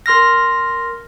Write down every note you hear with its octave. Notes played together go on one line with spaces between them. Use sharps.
A#4 C6 F6 A#6